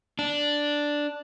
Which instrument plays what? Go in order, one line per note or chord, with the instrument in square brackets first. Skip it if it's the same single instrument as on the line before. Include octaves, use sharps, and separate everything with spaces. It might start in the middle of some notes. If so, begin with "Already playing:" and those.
[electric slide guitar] D4